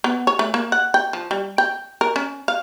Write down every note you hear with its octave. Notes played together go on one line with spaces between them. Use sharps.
B3
C#5
A3
A#3
F#5
G5
F3
G3
G5
A#4
C#4
F5